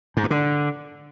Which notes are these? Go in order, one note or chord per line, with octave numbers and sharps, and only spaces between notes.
G#2
G2
D3